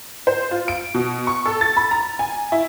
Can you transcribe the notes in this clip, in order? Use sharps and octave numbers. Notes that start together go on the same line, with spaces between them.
C5
F4
D7
B2
C#6
A4
A6
B5
A#5
G#5
E4